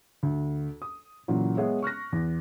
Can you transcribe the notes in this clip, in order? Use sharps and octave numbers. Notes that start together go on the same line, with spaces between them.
D2
D#6
A#2 C#3 E3 F#3
G#3 B3 G#4 C#5 E5
C#6 F6 F#6 A#6
E2